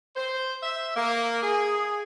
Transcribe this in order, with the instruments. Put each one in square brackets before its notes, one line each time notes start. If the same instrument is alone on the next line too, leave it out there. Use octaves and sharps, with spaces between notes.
[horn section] C5
E5
A#3
G#4